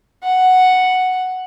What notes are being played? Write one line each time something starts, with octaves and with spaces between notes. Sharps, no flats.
F#5